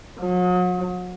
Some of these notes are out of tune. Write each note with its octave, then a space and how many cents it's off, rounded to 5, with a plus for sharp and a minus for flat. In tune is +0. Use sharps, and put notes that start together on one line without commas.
F#3 -40